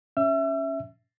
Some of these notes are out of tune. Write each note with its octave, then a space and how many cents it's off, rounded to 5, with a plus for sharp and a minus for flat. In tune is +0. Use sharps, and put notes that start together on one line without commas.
C#4 +0 E5 +0 E6 +40